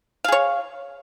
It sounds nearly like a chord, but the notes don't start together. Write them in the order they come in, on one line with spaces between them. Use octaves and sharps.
F5 G#4 C#5